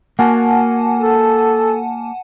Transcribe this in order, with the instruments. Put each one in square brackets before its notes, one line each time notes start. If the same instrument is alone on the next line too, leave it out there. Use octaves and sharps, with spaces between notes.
[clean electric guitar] A#3 F#4 [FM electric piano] F#5 G#5 A5
[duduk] A4